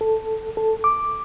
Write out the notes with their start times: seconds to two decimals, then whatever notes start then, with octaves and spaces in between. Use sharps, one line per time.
0.01 A4
0.57 A4
0.84 D6